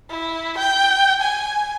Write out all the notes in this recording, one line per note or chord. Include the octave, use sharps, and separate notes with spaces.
E4
G5
G#5